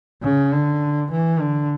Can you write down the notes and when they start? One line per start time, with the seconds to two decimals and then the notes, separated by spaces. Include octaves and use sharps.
0.23 C#3
0.52 D3
1.11 E3
1.40 D3